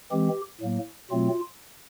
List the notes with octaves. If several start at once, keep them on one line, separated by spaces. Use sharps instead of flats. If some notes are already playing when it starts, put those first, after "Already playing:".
E3 G#3 C4 G4
A2 F#3 A#3
B2 F#3 A3 C4 F4